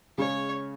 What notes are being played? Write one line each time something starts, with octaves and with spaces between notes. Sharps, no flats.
C#3 G#3 C#4 C#5